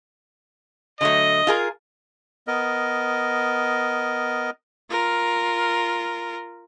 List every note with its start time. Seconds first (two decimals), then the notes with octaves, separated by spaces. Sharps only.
1.01 D3 F#3 A3 D#5
1.47 F4 G#4 A#4
2.47 B3 A#4 D#5
4.90 F4 A#4